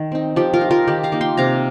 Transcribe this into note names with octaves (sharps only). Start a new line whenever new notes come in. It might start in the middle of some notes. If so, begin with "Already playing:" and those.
Already playing: D#3
C4 D#4
F3 G4
F4 A#4
D#4
F4 A#4
D#3 G4
F5 A#5
A#3 D#4
G5 C6
C3 F5 A#5